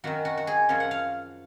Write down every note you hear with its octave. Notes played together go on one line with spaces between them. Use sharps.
F#2 D#3 F#3 F#4
F#4
F#4
G#4
F#2 F3 C#5
F#5
F5